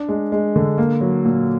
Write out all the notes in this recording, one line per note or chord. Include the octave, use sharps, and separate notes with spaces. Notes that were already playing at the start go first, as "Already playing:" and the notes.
Already playing: D4
G#3
G#3
D3
A#3
F#3
A#2